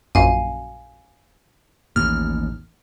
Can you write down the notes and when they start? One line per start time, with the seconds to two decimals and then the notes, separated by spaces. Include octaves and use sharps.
0.15 A#1 F#2 F5 G#5
1.96 A1 D#2 F6